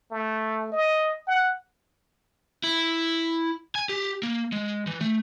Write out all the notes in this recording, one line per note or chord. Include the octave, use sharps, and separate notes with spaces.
A3
D#5
F#5
E4
G#5
G4
A#3
G#3
E3
A3